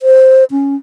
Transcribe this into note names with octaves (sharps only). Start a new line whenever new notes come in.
C5
C#4